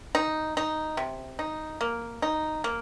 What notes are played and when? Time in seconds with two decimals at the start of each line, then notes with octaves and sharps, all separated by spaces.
0.15 D#4
0.57 D#4
0.97 C3
1.39 D#4
1.81 A#3
2.22 D#4
2.64 A#3